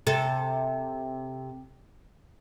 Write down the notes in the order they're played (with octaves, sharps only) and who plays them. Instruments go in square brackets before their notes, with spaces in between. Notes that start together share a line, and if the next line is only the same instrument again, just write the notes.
[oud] C3 A4